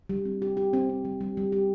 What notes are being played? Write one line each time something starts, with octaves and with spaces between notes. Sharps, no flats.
G3
C4
G4
G4
C4
C4
G3
G3
G3
G4